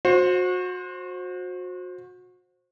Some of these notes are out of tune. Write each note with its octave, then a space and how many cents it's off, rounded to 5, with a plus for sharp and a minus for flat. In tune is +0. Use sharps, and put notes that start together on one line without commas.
F#4 -30 C5 +15